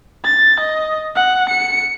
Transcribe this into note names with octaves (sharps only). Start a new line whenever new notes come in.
A6
D#5
F#5
C#7